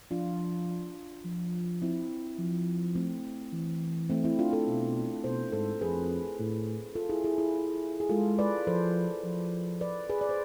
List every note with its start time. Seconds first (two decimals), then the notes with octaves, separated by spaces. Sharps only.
0.11 F3 D4 F4
1.25 F3
1.82 C4 E4
2.39 F3
2.96 A3 C4
3.53 E3
4.10 A3 C4
4.24 C4 E4
4.39 D4 F4
4.53 F4 A4
4.67 B2
5.24 B2 A4 C5
5.52 G#2 A4 C5
5.81 F2 G#4 B4
6.39 A2
6.95 F4 A4
7.09 E4 G#4
7.24 E4 G#4
7.38 E4 G#4
8.00 G#4
8.09 G#3 F4 A4
8.39 B4 D5
8.67 F3 A4 C5
9.24 F3
9.81 B4 D5
10.09 G#4 B4
10.21 D5
10.29 C5